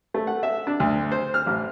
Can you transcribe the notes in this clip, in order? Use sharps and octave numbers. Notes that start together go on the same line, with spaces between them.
A3
F#5
E5
D4
D2
C5
F6
A1